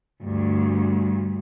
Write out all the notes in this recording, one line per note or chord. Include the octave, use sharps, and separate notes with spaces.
D2 G2